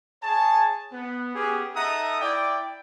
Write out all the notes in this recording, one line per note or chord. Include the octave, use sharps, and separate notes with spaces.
G#4 C#5 G#5 A5
B3
B3 C#4 G4 G#4
D#4 A4 E5 F#5 A#5 D#6
E4 D5 G5